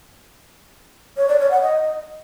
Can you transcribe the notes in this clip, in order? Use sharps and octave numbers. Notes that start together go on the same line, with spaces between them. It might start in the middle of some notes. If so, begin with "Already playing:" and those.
C#5
D5
C#5
F#5
D#5